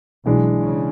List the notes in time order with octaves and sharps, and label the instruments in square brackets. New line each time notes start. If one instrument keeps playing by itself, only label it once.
[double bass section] B1 B2 [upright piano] E3 G#3 D4
[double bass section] C#3